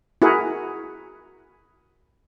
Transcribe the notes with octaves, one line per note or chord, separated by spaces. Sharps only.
E4 F#4 G#4 A#4 F#5